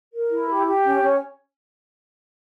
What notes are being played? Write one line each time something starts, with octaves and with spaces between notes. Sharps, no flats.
A#4
E4
G4
G4
C#4
C#4